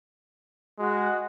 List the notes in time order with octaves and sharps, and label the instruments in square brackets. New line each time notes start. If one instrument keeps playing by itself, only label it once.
[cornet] G#3 [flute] F#4